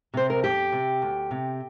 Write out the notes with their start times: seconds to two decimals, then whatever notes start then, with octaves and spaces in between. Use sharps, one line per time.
0.14 C3 C5
0.30 A#4
0.43 F2 G4
0.72 C3
1.02 D2
1.31 C3